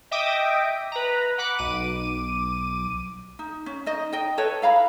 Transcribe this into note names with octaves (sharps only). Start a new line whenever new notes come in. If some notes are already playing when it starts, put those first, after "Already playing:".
D#5 E5 G5 D6 D#6 A#6
B4 A#5
F#5 B5 D6 F#6
B1 D6 D#7
D#4
C#4
D#4 D#5
D#4 D#5 G5
A4 B4 C#5
E4 F5 A#5 B5